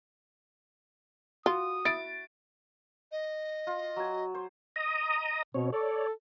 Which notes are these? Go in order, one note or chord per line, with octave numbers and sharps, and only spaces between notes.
F4 F#4 D#6
E4 A6 D7
D#5
F4
F#3 G#5
C5
D#5 A#5 D#6
B2 C4 C#5
A4 C#5 D5